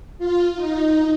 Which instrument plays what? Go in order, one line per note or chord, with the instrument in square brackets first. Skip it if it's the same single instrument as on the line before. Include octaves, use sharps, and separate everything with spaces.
[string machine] F4
D#4